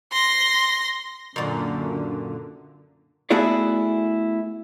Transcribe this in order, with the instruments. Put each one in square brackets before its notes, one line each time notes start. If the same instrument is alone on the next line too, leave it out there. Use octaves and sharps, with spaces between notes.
[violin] C6 A#6
[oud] F#2 A#2 [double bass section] D3
[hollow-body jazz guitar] A3 B3 E4 F#4 G#4 D5